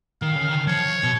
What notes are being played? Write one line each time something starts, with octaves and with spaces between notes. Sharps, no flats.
D#3 F5
C#3
D#3
F3 C#5
B2